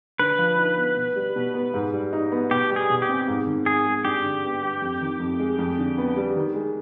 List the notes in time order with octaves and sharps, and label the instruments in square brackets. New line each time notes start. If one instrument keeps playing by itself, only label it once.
[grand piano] D3 [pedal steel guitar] B4
[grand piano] F3
D#4
B3
B2
G3
B2
B3
G#2
G3
D#4
B3
[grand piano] B2 [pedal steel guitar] G4
[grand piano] G3
[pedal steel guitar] G#4
[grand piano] B2
[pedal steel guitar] G4
[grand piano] C4
G#2
D#3
[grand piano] G#2 [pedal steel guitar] G#4
[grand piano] G#3
[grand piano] G2 [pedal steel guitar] G4
[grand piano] D3
B3
G3
F2
D#3
F2
G#3
F2
D3
B3
G3
D#3
G#3